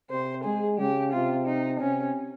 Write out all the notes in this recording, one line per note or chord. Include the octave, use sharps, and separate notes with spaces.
C3 C5
G#3 G#4
C#3 G4
C3 F4
D#4
C3 C#4